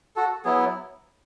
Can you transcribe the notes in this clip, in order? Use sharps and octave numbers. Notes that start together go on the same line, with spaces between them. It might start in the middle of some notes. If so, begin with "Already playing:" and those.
F#4 A4
F#3 B3 E4 G#4